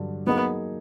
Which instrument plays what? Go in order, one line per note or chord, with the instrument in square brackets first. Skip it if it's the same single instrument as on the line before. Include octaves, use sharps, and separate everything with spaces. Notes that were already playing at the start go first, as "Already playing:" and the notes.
Already playing: [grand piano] G2 D3 F#3
[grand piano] F#3 A#3 D#4 G#4 [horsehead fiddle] B3